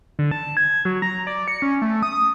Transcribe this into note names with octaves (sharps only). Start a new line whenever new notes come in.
D3
A5
G#6
F#3
A#5
D5
C#7
C#4
A3
D#6